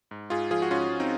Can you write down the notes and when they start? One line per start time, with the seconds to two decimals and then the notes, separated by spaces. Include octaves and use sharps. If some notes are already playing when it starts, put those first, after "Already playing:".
0.11 G#2
0.30 G#2 F4 G#4
0.51 F3 F4 G#4
0.62 F#4
0.71 G#2 C#4 F4
0.89 G#2
1.00 C4 D#4